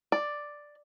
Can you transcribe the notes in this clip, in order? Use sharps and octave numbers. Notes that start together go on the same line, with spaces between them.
D5